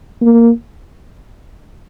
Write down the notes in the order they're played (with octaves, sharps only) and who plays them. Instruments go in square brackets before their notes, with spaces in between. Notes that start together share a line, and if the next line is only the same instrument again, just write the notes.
[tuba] A#3